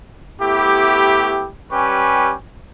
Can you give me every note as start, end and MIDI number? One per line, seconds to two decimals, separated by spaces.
0.41 1.48 57
0.41 1.48 59
0.41 1.48 64
0.41 1.48 67
1.70 2.33 55
1.70 2.33 61
1.70 2.33 67
1.70 2.33 71
1.70 2.33 80
1.70 2.33 85